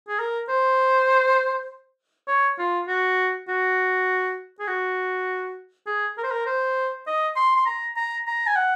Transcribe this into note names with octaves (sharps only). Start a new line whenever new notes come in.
G#4
A#4
C5
C#5
F4
F#4
F#4
G#4
F#4
G#4
A#4
C5
A#4
C5
D#5
C6
C6
A#5
A#5
A#5
G#5
F#5